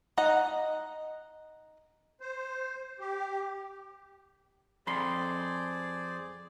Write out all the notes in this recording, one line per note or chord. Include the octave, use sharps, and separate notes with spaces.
D#4 D#5 F#5
C5
G4
F2 G#4 C5 D5 B5 C6